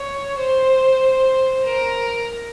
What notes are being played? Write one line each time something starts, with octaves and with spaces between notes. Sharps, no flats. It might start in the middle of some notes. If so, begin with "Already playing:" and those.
Already playing: C#5
C5
A#4